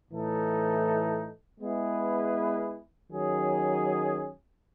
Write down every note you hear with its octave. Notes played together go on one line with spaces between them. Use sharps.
A2 E3 A3 D#4 A4
G#3 B3 E4 G#4 B4
D#3 F#3 C#4 G#4